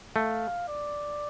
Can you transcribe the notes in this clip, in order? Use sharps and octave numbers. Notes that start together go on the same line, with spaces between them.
A3 F5
D5